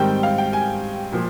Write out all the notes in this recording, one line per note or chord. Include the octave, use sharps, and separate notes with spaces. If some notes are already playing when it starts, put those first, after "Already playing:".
Already playing: G#2 D#3 G3 C4 G5
F5
G5
G#5
A#2 F3